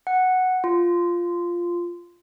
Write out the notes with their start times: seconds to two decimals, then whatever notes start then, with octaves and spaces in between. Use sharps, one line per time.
0.07 F#5
0.64 F4